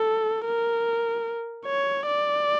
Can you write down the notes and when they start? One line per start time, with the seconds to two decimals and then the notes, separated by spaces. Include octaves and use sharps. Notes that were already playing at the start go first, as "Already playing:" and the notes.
Already playing: A4
0.45 A#4
1.66 C#5
2.07 D5